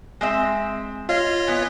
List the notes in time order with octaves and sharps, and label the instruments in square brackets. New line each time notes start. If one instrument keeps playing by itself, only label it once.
[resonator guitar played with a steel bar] G#3 C4 E5
[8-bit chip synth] F4 C#5 D#5 [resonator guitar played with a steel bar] F5
[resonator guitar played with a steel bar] E3 B3